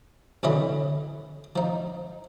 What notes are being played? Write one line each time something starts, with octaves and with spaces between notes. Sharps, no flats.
B1 D3 E3 C#4 D#5 B5
F3 D#4